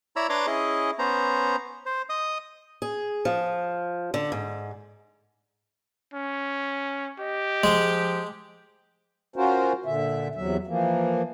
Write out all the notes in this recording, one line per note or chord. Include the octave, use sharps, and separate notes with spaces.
E4 C#5 D5 A#5 B5 E6
D4 B4 C#5 A#5 C6 D6
C#4 E4 G#4 D#5
B3 C#4 C5 A#5
C5
D#5 D#6
G#4
F3
D3
G#2
C#4
G4 D#5
F3 G#3
C#4 F4 F#4 A#4 C5
A#2 D3 E5
E2 C3 F#3 E5
E3 F3 A#3